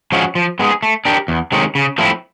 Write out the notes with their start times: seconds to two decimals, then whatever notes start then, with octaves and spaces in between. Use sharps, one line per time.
0.12 F3 G#3 C#4 F#4
0.35 F3
0.59 G#3 B3 D#4 G#4
0.83 A3
1.05 D4 G4 A#4
1.28 E2
1.52 C3 D#3 G#3 C#4
1.75 C#3
1.98 F3 A3 C4 E4